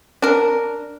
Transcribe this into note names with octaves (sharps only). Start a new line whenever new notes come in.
D4 A#4